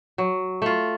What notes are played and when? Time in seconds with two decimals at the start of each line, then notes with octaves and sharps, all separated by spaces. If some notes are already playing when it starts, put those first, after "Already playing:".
0.18 F#3
0.62 A3 F4